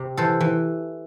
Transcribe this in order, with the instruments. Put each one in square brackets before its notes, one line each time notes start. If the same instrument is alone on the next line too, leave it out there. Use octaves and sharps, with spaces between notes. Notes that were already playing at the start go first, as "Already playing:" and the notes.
Already playing: [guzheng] C3
E3 A4 C5
E3